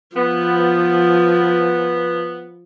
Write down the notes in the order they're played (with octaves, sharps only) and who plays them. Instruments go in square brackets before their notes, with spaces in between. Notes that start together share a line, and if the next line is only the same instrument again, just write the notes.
[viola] F3 [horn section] B3